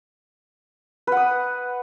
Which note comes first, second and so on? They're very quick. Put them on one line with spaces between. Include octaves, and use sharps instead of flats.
B4 F#5 D#6